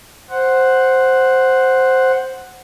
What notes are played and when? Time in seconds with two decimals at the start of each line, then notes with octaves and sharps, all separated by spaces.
0.30 C5 F#5